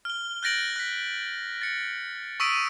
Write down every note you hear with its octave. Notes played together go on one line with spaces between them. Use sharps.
F6 G7
F#6 G6 A6 A#6 D7 F#7
F#6 B6
A6 C#7
C#6 D#6 E6 B6 D7 D#7